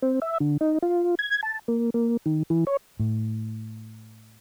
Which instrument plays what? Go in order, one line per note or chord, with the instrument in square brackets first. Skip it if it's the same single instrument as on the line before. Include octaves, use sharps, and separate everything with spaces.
[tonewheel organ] C4
E5
D3
D#4
F4
G#6
A5
A#3
A#3
D#3
E3
C#5
[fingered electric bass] A2